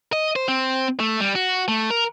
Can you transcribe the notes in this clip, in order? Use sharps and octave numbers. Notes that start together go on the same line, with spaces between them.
D#5
C5
C4
A3
G3
F#4
A3
A#4